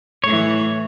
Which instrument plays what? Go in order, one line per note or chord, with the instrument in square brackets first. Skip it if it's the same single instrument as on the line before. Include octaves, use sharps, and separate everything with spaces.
[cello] A2 E3 [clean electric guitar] C#5